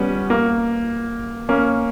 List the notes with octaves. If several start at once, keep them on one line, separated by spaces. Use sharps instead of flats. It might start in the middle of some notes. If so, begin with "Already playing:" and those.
Already playing: G3 B3 C#4
A#3
A#3 C#4